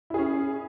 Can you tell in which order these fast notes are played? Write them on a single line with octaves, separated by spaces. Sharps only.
E4 G#4 C#4